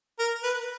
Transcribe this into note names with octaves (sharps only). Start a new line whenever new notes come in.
A#4
B4